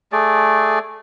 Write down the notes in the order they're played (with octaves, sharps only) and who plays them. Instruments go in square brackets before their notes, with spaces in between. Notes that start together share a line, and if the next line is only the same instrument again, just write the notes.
[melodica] A3 G#4 D5